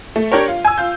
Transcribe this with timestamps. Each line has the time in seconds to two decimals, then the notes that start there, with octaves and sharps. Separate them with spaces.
0.16 A3
0.32 D4 G4 A#4 C#5
0.48 F4
0.65 G#5 E6
0.78 F4 G6